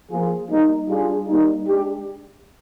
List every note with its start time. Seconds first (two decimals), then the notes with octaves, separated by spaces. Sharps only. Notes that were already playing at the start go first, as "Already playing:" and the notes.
0.11 F3 A#3 F4 G#4
0.50 G3 A#3 D#4
0.89 G3 D4 F4 G#4
1.28 G3 A#3 D#4
1.67 G#3 D4 G4